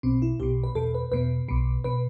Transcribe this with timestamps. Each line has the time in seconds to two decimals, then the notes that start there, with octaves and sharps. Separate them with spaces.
0.03 B1 B2 C4
0.22 E4
0.40 B1 B2 G4
0.64 B4
0.75 E2 B2 A4
0.95 B4
1.12 E2 B2 B4
1.48 B1 B2
1.84 B2 B4